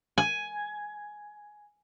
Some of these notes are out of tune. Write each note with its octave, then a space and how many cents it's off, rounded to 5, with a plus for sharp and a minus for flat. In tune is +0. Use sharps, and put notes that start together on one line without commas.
G#5 +5